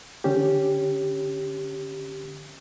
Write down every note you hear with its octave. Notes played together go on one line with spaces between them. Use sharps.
D3 C#4 G4